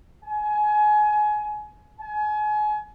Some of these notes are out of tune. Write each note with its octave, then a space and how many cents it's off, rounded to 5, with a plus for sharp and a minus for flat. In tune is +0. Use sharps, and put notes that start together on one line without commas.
G#5 +25
G#5 +35